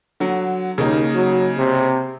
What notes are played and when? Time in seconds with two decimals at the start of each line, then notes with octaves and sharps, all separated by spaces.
0.20 D3 F#3
0.78 D#2 C#3 A#3 D#4
1.15 F#3
1.58 C3